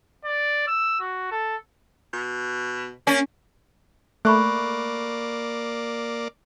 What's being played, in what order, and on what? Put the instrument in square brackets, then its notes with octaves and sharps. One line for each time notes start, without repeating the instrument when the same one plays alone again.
[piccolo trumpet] D5
E6
F#4
A4
[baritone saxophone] B2
[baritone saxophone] A#3 [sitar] C#4
[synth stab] A3 [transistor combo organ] A#3 D5 [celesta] B5 C#6 F#6